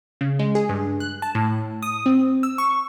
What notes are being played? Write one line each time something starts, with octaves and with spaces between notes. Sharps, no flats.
C#3
G#3
G#4
G2
F#6
A5
A2
D#6
C4
E6
C#6